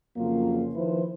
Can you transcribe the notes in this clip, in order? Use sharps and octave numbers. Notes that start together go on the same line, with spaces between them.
F2 C#3 F#3 A#3 F4
D#3 F3 E4 B4 C5